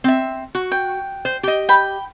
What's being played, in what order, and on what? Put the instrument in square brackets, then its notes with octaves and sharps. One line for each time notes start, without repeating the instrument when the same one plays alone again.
[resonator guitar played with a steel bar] C4 E5
F#4
[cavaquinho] G5
[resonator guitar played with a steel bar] C5
G4 D#5
[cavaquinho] G5 B5